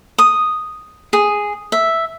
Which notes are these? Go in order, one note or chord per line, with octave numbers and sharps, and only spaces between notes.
D#6
G#4
E5